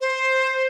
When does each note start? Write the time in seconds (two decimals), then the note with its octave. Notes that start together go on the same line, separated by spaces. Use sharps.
0.01 C5